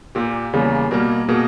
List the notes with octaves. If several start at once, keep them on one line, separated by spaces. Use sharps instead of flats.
A#2 A#3 G4
E2 C#3 G3 A#3
B2 G3 A#3 A#4
B2 A#3 G#4